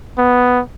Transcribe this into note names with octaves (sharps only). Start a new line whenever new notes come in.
B3